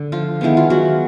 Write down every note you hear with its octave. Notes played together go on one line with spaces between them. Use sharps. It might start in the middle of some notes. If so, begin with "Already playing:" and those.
Already playing: D3
F3 F4
D#3 G#3 B3 E4
F4
F#3 F#4